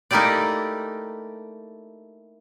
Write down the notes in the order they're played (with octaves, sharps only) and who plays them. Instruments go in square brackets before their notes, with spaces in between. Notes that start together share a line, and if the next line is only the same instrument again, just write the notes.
[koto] A3 A#3 D#4 E4 G4 D5